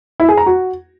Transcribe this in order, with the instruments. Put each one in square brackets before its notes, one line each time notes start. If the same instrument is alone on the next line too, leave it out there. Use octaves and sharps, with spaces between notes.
[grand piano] E4
G#4
A#5
F#4